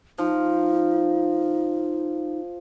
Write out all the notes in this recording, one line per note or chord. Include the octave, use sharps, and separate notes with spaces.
F3 D#4